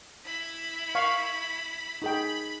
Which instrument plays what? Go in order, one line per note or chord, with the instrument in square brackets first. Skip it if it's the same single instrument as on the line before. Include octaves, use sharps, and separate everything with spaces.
[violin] E4 B5
[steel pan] F5 C#6
[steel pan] D#4 G#4 G5 [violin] B5